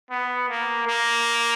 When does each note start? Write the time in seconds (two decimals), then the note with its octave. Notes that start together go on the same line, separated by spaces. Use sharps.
0.10 B3
0.49 A#3
0.87 A#3